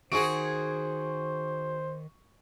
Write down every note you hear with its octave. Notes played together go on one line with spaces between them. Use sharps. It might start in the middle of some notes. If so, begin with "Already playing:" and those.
D#3 F#4 G#4 C5 C#6 D7